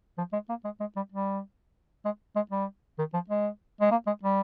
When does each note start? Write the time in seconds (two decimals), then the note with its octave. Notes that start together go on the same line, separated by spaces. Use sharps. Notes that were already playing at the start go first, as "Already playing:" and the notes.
0.18 F3
0.33 G#3
0.49 A#3
0.65 G#3
0.80 G#3
0.96 G3
1.12 G3
2.05 G#3
2.36 G#3
2.51 G3
2.98 D#3
3.14 F3
3.30 G#3
3.81 G#3
3.91 A#3
4.07 G#3
4.23 G3